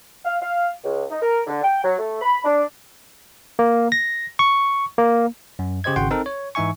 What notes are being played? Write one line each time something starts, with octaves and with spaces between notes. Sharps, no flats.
F5
F5
C#2
D#4
A#4
D3
G5
F#3
A3
B5
D4
A#3
A#6
C#6
A#3
F#2
C#3 G4 C5 D#5 G#6
G#1 C#3 F#4 F#5 G5 C6
C4 D#4 A4 A#4
C#5
G#2 E3 D#4 E5 G#5 C#6